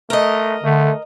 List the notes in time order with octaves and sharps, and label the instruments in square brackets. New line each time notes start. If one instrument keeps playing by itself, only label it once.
[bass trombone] A3 [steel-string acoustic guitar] A#4 D#5
[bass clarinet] D3 [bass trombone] A3